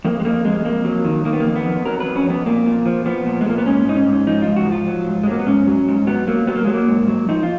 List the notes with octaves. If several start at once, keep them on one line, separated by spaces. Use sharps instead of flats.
F2 A#3
G#3
F2 A#3
F2 G#3
G#3
F2 A#3
F#3
D#3
D#3 A#3
B3
F2 A#3
B3
F2
F#3 A#4
B4
F2
C#4
F2 B3
A#2 A#3
A#2
F3
F3 B3
A#2
G#3
A#2 A#3
B3
G#2 C#4
G#2 D#4
C#4
G#2
F3 D#4
F4
G#2
F#4
F3
F4
F#3
G#2
G#3
F#3 A#3
B3
G#2 C#4
F#3
G#2
F#3 B3
F#3 A#3
F#3 B3
A#3
F#3 G#3
A#3
G#2
F#3
F3 D#4
F4